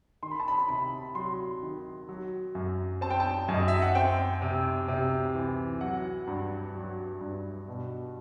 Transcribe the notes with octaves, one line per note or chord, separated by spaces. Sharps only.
D#3 C6
B5
A5
B5
C3 B5
F#3 C6
D#3
F#3
F#2
C4 A5
G5
A5
F#2
D#5
E5
F#5
C4 G5
C3
C3
E3
F#3 F#5
G2
F#3
G2
B2